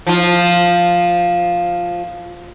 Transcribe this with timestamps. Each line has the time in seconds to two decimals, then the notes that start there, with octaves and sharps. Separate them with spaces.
0.07 F3 F4